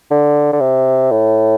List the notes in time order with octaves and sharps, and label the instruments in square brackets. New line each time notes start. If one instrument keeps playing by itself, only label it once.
[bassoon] D3
D3
C3
A2